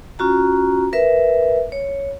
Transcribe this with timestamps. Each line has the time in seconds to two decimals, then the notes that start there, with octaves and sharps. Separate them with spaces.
0.19 C#4 F4 F#4 A#5
0.93 A#4 B4 E5
1.72 C#5